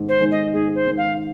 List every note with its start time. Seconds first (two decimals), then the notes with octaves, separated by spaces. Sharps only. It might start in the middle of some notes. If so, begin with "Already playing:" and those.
Already playing: G#2 D#3 G#3
0.09 C5
0.20 D#3 G#3
0.31 D#5
0.53 G#2 G#4
0.75 C5
0.86 D#3 G#3
0.98 F5